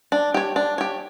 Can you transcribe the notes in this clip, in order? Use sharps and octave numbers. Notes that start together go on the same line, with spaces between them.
D4
G4 C#5
D4
G4 C#5